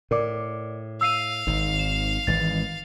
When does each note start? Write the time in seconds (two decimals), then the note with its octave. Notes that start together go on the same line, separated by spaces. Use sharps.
0.11 A2 A#4 D5 D6
1.01 F5 E6 C7 D#7
1.47 G#1 G#2
1.79 E7
2.27 G#1 E3 G#3 A6